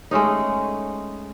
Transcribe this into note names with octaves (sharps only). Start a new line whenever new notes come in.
G#3 A3 C#4 D#4